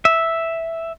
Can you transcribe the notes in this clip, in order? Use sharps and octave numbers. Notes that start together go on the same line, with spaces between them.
E5